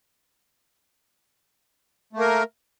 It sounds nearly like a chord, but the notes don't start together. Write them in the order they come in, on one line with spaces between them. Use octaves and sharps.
A3 A#3 A#4